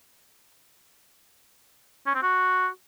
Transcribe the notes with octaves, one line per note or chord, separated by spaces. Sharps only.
C#4
C4
F#4